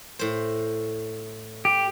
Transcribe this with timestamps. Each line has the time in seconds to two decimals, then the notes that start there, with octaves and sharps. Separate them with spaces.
0.19 A2 C5
1.65 G4